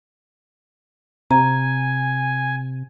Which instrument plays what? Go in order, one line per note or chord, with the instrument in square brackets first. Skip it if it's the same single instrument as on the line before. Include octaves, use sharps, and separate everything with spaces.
[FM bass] C3 [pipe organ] G#5 [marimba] A#5